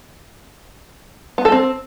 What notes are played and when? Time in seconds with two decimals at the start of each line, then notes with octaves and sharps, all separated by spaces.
1.38 B3
1.45 A4
1.52 C4